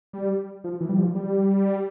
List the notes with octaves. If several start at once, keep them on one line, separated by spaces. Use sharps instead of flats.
G3
F3
E3
G3
F3
G3